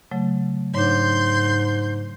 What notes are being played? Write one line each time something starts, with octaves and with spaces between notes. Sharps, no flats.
C#3 F#3 A3
G#2 D4 C#5 C6 G6